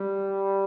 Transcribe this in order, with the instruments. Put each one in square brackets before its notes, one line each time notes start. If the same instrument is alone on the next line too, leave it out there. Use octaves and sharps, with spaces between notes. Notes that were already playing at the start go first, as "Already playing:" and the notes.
Already playing: [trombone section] G3